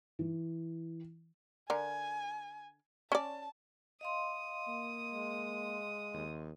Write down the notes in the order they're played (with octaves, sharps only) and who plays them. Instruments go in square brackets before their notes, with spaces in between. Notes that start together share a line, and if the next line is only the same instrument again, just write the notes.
[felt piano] E3
[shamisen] D3 A#4 [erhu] G#5
[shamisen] C#4 D5 [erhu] A5
[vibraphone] D#5 F5 C6 [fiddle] D#6
[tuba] A#3
[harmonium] G#3
[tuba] D#2